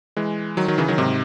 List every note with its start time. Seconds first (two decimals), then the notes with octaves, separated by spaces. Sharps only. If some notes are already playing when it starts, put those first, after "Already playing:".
0.17 E3 G#3
0.57 D#3 F#3
0.68 D#3 F#3
0.78 C#3 E3
0.88 D#3 F#3
0.98 G#2 C3